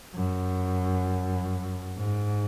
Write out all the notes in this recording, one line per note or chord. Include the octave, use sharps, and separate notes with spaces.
F#2
G#2